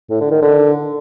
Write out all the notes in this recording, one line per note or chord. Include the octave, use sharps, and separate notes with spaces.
A2
D3
D#3
D3